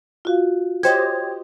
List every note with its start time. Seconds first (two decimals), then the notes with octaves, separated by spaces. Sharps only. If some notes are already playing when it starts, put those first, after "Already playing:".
0.25 F4 F#4 F5
0.83 G4 C5 C#5 D#5 G5 G#6